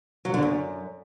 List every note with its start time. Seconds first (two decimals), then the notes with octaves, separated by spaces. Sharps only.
0.25 F#3
0.34 D3
0.42 F#2